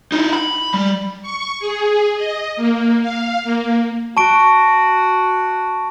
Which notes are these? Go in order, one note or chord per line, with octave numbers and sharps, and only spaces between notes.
D#4 E4
B5
G3
C#6
G#4
D#5
A#3
F5
A#3
F#4 A5 C#6 D7